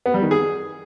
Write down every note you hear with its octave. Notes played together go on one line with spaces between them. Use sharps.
B3
G3
D#3
G#4